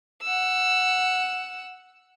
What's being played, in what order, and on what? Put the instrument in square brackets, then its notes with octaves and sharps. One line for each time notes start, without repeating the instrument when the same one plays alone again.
[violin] F#5 E6